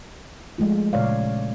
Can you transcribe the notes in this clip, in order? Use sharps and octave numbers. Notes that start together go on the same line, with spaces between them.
F3 G#3 A3 F4
A#2 C#3 C#5 D5 F5